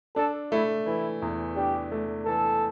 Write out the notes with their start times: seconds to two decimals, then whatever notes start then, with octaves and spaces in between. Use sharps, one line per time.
0.16 D4 A4
0.52 A3 E4
0.86 E3 E4
1.22 E2
1.56 D4 G4
1.92 A3
2.26 E3 A4